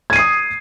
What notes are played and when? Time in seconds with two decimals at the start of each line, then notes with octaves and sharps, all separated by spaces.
0.10 G#6
0.13 D#7
0.16 C7
0.19 D#6